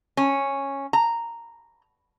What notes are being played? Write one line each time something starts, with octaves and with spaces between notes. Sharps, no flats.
C#4
A#5